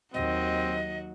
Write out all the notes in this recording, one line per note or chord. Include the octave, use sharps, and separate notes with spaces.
D#2 F#3 C4 D#4 F#4 D#5